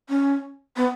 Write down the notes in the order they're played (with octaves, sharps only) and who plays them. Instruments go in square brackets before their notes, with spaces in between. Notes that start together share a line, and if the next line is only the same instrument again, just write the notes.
[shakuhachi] C#4
B3